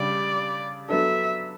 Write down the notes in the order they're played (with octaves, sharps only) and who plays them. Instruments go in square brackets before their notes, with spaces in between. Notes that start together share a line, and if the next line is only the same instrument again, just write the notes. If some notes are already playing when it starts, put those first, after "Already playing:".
Already playing: [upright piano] C#3 G3 D4 G4 [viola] D5
[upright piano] F#3 B3 D4 A4 [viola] E5